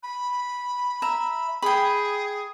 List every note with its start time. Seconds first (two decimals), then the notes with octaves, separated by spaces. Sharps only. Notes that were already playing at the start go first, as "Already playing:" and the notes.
0.03 B5
1.02 E5 A#5
1.62 G#4 G5 B5